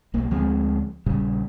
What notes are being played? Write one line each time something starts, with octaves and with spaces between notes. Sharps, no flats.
B1 A#3
D2 F3 G#3 C4
A#1 A#2 C#3 G3